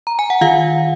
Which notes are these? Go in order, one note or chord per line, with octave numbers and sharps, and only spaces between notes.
A#5
G#5
F#5
D#3 F4 F5